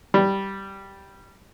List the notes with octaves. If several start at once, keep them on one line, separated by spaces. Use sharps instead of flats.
G3